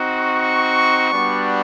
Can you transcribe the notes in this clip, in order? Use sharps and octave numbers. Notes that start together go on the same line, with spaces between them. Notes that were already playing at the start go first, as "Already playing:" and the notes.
Already playing: C4 D#4 F#4
C#6
G3 B3 D4 F#4